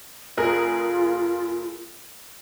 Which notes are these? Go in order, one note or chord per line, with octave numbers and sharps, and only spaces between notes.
F1 F4 G#4 A#4